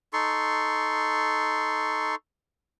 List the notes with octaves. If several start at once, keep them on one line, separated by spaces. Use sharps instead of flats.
D#4 A4 C6 C#6